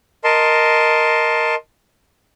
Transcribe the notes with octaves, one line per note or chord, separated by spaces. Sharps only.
A#4 D#5 A5 C6